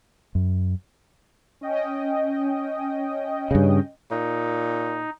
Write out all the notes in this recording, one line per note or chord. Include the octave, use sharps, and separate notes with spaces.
F#2
C#4 D#5 G5
G2 C#3
A#2 D#4